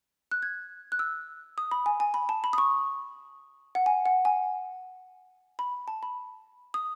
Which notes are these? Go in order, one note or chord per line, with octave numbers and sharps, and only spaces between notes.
F#6
G#6
F#6
E6
D#6
B5
G#5
G#5
B5
A5
B5
D#6
C#6
F#5
G#5
F#5
G#5
B5
A5
B5
D#6